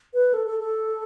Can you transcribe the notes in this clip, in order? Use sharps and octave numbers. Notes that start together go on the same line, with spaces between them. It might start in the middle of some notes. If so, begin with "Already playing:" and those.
B4
A4
A4
A4